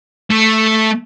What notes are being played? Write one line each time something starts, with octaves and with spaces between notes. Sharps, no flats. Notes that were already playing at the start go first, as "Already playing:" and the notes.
A3